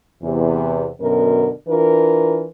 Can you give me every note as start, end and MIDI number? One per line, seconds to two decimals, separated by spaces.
0.23 0.88 40
0.23 0.88 48
1.01 1.50 42
1.01 1.50 47
1.01 1.50 50
1.01 1.50 70
1.69 2.46 52
1.69 2.46 62
1.69 2.46 65
1.69 2.46 70